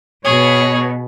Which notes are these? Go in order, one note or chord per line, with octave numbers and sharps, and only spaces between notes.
B2 G#4 C#5